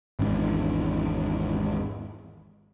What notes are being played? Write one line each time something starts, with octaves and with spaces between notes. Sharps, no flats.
G#1 E2 G#2 D4